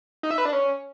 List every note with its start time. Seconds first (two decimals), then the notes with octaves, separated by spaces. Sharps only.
0.23 D#4
0.31 E5
0.38 B4
0.45 D4
0.53 C#4